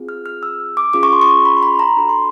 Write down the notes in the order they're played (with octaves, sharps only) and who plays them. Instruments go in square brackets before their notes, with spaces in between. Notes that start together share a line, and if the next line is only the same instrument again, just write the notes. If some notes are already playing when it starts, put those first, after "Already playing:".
Already playing: [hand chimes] C4 F4 G#4
F6
F6
E6
D6
C#4 F4 G#4 D6
C#6
C6
C#6
B5
C6
B5
A#5
D4 F#4 A4 B5
C6